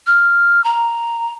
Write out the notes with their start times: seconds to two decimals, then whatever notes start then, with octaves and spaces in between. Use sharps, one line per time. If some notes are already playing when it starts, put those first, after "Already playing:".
0.07 F6
0.64 A#5